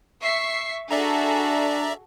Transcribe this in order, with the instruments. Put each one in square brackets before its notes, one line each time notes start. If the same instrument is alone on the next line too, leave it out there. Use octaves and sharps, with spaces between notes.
[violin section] E5 C#6 C7
[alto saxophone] D4 [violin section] F#4 G#4 A4 [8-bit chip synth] D5 E5 A#5